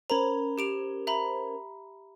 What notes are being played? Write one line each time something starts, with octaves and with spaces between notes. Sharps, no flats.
C#4 A#4 C5 A#5 B5
G4 D7 F7
E5 A#5 B5